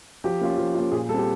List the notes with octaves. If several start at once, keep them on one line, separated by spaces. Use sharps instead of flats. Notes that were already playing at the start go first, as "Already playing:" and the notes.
F3 G4
A#3 C#4 F4
F3
A#3 C#4 F4
A#2 G#4
G3 C4 G4 A4